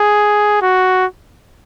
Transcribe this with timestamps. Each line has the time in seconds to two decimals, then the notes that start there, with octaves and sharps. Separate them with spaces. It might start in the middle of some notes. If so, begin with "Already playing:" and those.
Already playing: G#4
0.62 F#4